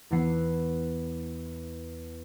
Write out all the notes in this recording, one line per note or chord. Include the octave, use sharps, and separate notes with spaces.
E2 E3 B3 C7